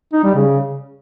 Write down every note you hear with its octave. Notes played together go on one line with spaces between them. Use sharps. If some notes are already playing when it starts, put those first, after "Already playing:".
D#4
G3
C#3